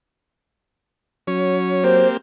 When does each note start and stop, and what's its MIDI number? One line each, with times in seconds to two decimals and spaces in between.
1.28 2.05 54
1.28 1.84 61
1.28 1.84 73
1.84 2.17 58
1.84 2.17 60
1.84 2.17 67
1.84 2.08 72